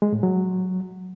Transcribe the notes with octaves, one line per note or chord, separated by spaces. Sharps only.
G#3
A2
F#3